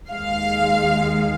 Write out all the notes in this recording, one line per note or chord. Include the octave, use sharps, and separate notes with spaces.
D#2 D#3 G#3 F5